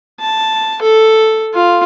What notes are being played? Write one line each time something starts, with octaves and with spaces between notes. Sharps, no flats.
A5
A4
F4